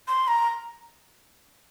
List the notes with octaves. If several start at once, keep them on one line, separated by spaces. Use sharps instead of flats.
C6
A#5